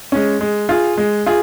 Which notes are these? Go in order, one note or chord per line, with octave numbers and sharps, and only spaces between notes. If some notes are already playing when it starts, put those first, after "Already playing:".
G#3 C#4
G#3
F4 G#4
G#3
F4 G#4